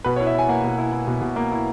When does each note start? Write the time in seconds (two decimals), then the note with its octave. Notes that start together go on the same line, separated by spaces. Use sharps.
0.04 B2 B4
0.16 C#5
0.20 E4
0.27 E5
0.35 E4 G#5
0.49 A#3 F#5
0.64 B2
0.78 E4
0.92 E4
1.07 B2
1.22 B2
1.36 A#3
1.52 E4